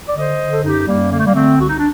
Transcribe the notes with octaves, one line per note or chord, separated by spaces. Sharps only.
D5
D3 C5 D#5
D3
A4
F#2 D#4 G4
F#2 G3 A#3
D3 A#3
A3
G3 A#3
D3 A3 C4
C2 F#4
D#4
D4